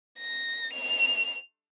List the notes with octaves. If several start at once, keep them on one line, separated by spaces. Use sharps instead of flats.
A#6
F7